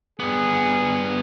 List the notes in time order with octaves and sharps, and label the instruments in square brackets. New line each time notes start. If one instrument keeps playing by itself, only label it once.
[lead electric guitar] G2 B3 [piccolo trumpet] G#4